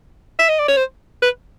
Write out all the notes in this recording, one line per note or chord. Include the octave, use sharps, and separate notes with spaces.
E5
D#5
D5
C#5
C5
B4